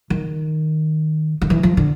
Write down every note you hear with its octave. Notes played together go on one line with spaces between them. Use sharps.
D#3
D#3
E3
F3
D3